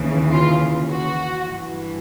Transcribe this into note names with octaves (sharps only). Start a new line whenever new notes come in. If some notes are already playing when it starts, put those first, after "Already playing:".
Already playing: D#2 C#3 E3
F4
F#4
G2 E3